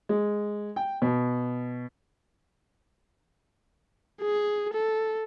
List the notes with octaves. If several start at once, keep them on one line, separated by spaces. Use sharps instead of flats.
G#3
G5
B2
G#4
A4